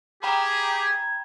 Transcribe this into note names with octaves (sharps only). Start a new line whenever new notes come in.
G4 G#4 G5 A#5 B5 G#6